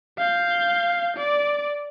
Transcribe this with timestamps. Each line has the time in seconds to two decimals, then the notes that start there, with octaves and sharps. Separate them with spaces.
0.18 F5 G6
1.17 D5